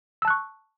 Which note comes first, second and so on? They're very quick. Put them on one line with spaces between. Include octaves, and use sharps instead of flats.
E6 A5 F#6 C#6